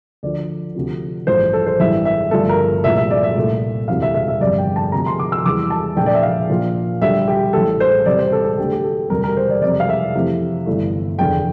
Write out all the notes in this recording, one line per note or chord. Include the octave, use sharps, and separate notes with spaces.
D2 D3 F3 D5
D2 C3 F3
A1 G2 F3 A3 C5
A4
C5
A1 G2 E3 G3 E5
E5
G1 G2 F3 A3 A4
A#4
C2 A#2 F3 A3 E5
E5
D5
E5
C2 A#2 A3
E1 D2 C3 E3 G3 F5
E5
E5
E5
G1 F2 C3 G3 D5
G5
A5
D2 C3 F3 A3 A#5
C6
D6
E6
E2 E3 G3 D6
A5
A#1 A#2 A3 G5
D5
E5
F5
A#1 A#2 F3
D2 D3 G3 E5
G4
A1 A2 G3 A4
C5
E2 C3 G3 D5
C5
A4
A4
D2 D3 A3 G4
G4
A4
E1 D2 C3 G3 A#4
A#4
C5
D5
F2 C3 G3 D5
F5
E5
F2 C3 E3 A3
G1 G2 E3 A3
F1 E2 D3 G5